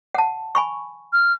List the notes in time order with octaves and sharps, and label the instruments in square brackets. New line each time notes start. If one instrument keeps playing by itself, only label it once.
[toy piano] F#5 A5
G#5 B5 C#6
[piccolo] F6